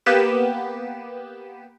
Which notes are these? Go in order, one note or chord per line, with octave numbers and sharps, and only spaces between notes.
A#3 B3 G4 B4 E7